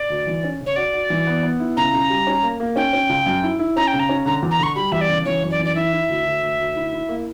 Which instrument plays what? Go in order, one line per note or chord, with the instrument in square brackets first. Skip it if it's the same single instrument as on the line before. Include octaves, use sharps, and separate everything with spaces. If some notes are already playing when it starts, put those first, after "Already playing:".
Already playing: [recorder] D5
[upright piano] D2
E3
C#4
C#3
[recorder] C#5
[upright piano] F#4 [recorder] D5
[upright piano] F#4
E3
B3
B3
E4
[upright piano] C#3 [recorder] A#5
[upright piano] C#3
G3
C#4
A#3
A#3
[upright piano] C#4 [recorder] G5
[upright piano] C#4
C#2
F#2
E4
E4
[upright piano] C#4 [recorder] A#5
[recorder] G5
[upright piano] C#3
[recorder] A#5
[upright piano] C#4
[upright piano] D3 [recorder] A#5
[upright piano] E2
[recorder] A#5
[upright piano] D3 [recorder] C#6
[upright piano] G3 [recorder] B5
[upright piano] E2 [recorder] E5
[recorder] D5
[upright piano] C#3
[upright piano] E3 [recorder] C#5
[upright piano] F#2
[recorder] D5
[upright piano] E3
[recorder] D5
[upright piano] E4 [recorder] E5
[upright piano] E4
D2
D2
D2
D2
E4
E4
A#3